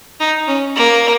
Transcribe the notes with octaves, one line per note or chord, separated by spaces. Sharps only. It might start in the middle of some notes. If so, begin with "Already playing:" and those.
D#4
C#4
A#3